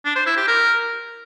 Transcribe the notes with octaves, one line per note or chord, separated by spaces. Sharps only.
D4
C5
E4
G4
A#4